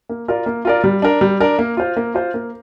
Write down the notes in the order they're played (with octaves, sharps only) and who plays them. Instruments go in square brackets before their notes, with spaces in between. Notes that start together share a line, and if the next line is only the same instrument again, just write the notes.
[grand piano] A#3
F4 A#4 D5
A#3
F4 A#4 D5
G3
D4 A#4 D5
G3
D4 A#4 D5
A#3
F4 C5
A#3
F4 C5
A#3